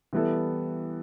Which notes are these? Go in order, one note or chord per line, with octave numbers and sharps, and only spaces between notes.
E3 G3 B3 E4 A4